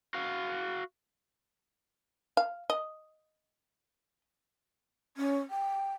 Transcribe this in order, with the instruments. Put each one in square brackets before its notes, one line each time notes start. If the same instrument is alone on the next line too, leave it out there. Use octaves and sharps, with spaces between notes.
[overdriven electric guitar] F#4 F5
[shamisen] F5
D#5
[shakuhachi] C#4
G5